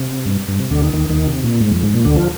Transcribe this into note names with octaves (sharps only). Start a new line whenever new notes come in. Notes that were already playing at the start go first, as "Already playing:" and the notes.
Already playing: C3
G2
G2
C3
D2 D3
D#2 D#3
D#2 D#3
D#2 D#3
C3
A#2
G#2
F2
G#2
A#2
D2 D3
F3